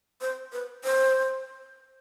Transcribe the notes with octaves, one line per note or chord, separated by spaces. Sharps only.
C5
B4
C5